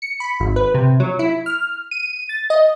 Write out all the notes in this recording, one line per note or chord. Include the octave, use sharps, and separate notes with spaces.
C#7
B5
G#1
B4
C3
F#3
E4
F6
D#7
A6
D#5